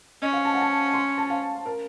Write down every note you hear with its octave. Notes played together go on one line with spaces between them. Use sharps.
C#4 D#5
F5
A5
F#5
A5
C6
A5
F5
A#4